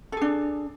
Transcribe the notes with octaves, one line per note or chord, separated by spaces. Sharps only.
D4 G#4 A4